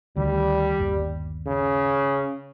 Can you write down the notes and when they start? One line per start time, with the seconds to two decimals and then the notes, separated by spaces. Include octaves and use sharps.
0.16 D2 D#3 G3
0.80 G1 D#2
1.47 C#3